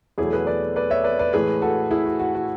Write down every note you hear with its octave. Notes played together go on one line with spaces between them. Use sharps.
E2 B2 F#3 A3 E4 G#4
G#4 B4
B4 D5
B4 D5
C#5 E5
B4 D5
B4 D5
A2 E3 G#3 G#4 B4
F#4 A4
E4 G#4
F#4
F#4
F#4